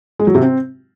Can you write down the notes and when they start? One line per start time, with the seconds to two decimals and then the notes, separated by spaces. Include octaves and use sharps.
0.19 G#3
0.27 F#3
0.35 C3
0.42 C4